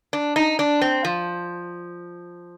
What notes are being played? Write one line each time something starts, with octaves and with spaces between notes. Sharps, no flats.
D4
D#4
D4
C4
F3